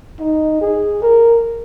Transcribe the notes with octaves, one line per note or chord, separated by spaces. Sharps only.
D#4
G#4
A#4